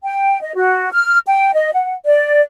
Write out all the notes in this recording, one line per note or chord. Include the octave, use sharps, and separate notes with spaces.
G5
D#5
F#4
F6
G5
D#5
F#5
D5